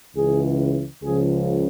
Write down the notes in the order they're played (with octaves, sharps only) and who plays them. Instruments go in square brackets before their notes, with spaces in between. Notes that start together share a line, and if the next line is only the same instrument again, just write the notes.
[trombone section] C#2 C#3 E3 G#4
C#2 C#3 F3 G#4